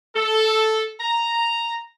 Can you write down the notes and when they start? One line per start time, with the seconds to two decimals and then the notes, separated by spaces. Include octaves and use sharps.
0.16 A4
1.00 A#5